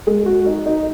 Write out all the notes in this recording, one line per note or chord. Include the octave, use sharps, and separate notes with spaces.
G#3
F#4
D#4
D#4